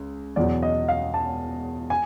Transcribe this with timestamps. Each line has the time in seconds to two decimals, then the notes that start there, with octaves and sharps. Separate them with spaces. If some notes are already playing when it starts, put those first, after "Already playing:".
Already playing: C#2
0.36 E2 B2 F#3 D5
0.63 D#5
0.88 F5
1.14 A5
1.90 G#5